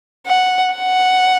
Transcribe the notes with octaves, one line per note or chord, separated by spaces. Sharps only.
F#5
F#5